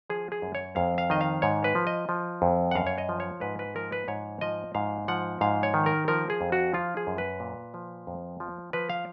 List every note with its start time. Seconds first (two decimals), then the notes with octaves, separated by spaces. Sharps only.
0.10 F3 G#4
0.32 G#4
0.42 F#2
0.55 C#5
0.76 F2 F5
0.98 F5
1.10 D#3 D#5
1.21 F5
1.42 G#2 C#5
1.64 B4
1.75 F3
1.87 D#5
2.09 F3
2.42 F2
2.71 F#5
2.75 F#2 F5
2.87 C#5
2.98 D#5
3.09 F3
3.20 C#5
3.41 G#2 B4
3.59 B4
3.76 F3 A#4
3.92 B4
4.08 G#2 C#5
4.41 F3 D#5
4.75 G#2 F5
5.08 F3 F#5
5.41 G#2 F5
5.63 C#5
5.74 D#3
5.86 A#4
6.08 F3 A#4
6.30 G#4
6.41 F2
6.52 F#4
6.74 F3 F4
6.97 G#4
7.07 F#2
7.18 B4
7.40 A#2
7.74 F3
8.07 F2
8.40 F3
8.73 F3 B4
8.90 F5